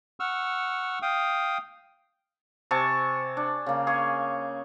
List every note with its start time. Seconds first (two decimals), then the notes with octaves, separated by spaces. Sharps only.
0.20 F#5 C#6 E6 F6
1.02 F5 G5 D#6
2.71 C3 G#5 A5 C#6
3.37 D4
3.66 C#3 A#3
3.87 G#4 C#5